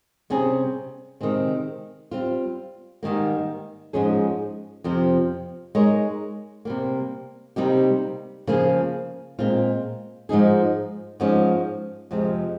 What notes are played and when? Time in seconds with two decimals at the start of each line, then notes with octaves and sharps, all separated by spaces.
0.30 C3 G3 C#4 G#4
1.21 C3 D#3 G#3 C4
2.11 G3 C4 F4
3.03 G#2 D#3 G3 A#3
3.93 G#2 F3 G#3 C#4 G#4
4.84 F2 C3 F3
5.75 G#3 D#4 A#4 C#5
6.65 C3 G3 A#3
7.56 C3 G3 A#3 D#4 G4
8.47 C#3 F3 A#3 F4 G#4
9.39 A#2 G#3 C4 F4
10.29 G#2 F3 G#3 D#4 G#4
11.20 G#2 F3 G#3 C#4
12.11 F2 C3 F3 G#3